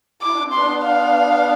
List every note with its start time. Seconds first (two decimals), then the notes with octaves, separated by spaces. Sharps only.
0.22 E4 D6
0.33 D4
0.44 C4
0.53 B3 D4 C6
0.83 F5